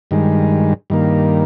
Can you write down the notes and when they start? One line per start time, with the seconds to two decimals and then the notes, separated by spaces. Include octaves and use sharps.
0.11 G2 D#3 G#3
0.90 G2 D#3 A#3